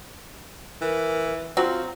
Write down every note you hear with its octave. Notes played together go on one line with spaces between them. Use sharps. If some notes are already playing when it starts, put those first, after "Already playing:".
E3 A#4
F#3 C4 F4 F#4